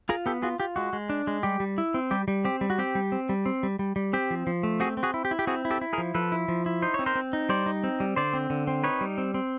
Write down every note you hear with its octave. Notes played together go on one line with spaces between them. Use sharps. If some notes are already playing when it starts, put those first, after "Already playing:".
F4 G#4 A#4
B3 G4 A4
F4 F#4 G#4
F4 G4
G#3 F#4
G#3
D4
G#3
G3 G4
G3
E4
C4
G3 G4
G3
C4 G4
G3
F#4
C4 G4
G3
C4
G3
C4
G3
G3
G3
C4 G4
F3
F3
A3
C4 F#4 G#4
C4
F#4 G#4
E4
G4
E4
G4
C4 F#4 G#4
E4
G4 A4
E4
G#4 A#4
F3
F3 A4 B4
E4
F3
E4
D#4 C5
C4 C#5
A#4 C5
C4
D#4
G3 C5 D5
D#4
C4
G3
D3 C5 D5
C4
D3
C4
D#4 B4 C#5
G3
C4
C4